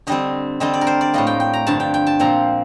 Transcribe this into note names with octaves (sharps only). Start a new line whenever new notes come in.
D3 G3 C4 D#5
D3 G3 C4 D#5
D5
A#4
C5
D5
A2 G3 A#3 D#5
G5
G5
A#5
G2 D3 F3 A5
G5
G5
A5
A#2 F3 C4 A#5